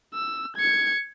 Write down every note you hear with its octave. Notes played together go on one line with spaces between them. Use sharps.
E6
G#6 C#7